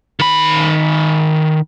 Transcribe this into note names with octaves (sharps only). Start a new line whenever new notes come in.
D#3 B5